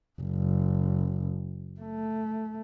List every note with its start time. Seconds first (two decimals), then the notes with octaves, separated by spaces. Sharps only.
0.21 F#1
1.80 A3